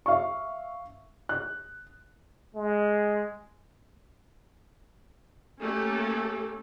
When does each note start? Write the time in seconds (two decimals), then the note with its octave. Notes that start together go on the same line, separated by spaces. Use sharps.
0.06 E5 F5 C#6
1.29 F#6
2.55 G#3
5.61 A3 A#3 C#4 G4 A4